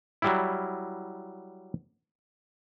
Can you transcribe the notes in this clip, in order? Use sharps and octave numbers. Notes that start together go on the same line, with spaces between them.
F#3 G3 E4